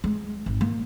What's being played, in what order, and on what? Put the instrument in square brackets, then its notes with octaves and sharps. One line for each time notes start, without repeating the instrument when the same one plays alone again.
[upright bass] G#3
G#1
A#3